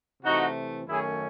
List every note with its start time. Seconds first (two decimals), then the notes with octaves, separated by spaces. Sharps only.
0.23 C3 E3 A3 D#4 F#4
0.87 F#2 D#3 A3 C#4 E4 G#4